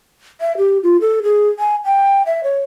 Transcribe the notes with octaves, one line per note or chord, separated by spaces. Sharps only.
E5
G4
F4
A4
G#4
G#5
G5
E5
C#5